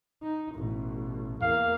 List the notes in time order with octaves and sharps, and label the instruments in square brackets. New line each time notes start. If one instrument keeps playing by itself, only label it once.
[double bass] D#4
A1 B2
[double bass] E2 A#3 [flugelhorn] F5